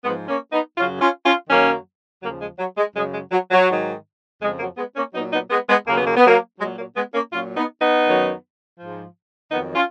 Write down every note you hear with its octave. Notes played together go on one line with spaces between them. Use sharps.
G#2 F3 G#3 B3
A#3 C#4
B3 D#4
F#2 C#3 F#3 C#4 F4
C#4 F4
C#4 F4
F#2 D#3 F#3 A#3 C#4
D#2 C#3 F3 F#3 A#3
G#3
F#3
G#3
F#2 C#3 F#3 G#3
G#3
F#3
F#3
G#2 D#3 F#3
F2 C#3 F3 G#3
F#3 A#3
G#3 B3
A#3 C#4
A#2 F#3 B3 D#4
B3 D#4
G#3 B3
G#3 B3
D#2 C#3 F#3 A#3
B3
A#3
B3
F#3 A#3
A#2 F#3 G#3
F#3 A#3
G#3 B3
A#3 C#4
A#2 F#3 C#4 F4
B3 D#4
B3 D#4
F#2 D#3 F#3
G#2 F3
F2 D#3 F#3 B3 D#4
C#4 F4